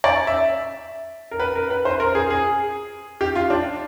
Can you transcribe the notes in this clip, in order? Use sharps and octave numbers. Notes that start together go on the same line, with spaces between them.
D5
E5
A#4
B4
A#4
B4
C5
A#4
G#4
G#4
G4
F4
D4